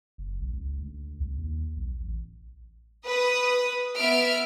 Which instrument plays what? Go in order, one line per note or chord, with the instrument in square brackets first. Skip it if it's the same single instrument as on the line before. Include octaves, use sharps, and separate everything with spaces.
[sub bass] F#1
B1
C#2
D2
C2
D#2
B1
A1
[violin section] B4 D#6
B3 E5 F6 D7